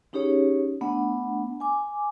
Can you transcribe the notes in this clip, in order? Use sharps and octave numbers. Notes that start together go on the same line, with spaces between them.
C#4 D#4 G4 G#4 C#5
A3 B3 D4 F#5
G#5 D6